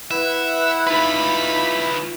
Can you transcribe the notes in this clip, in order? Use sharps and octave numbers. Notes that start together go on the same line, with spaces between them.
E4 B4 E5 F#5
D#4 F4 B4 B5